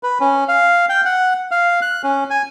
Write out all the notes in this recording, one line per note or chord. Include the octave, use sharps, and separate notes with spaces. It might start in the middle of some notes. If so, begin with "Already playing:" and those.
B4
C#4
F5
G5
F#5
F5
F#6
C#4
G#5